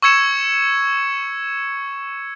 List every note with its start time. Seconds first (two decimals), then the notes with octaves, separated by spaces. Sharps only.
0.02 C#6 E6 G#6 C#7 E7